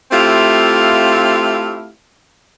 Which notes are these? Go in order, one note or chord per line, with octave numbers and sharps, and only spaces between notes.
A3 C4 E4 F4 G4 F5